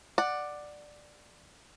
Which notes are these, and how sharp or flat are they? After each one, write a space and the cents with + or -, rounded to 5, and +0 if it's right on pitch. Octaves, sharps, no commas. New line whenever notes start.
D5 +10 F#5 +0